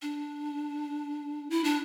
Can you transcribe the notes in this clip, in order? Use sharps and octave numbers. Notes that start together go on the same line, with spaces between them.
D4
E4
D4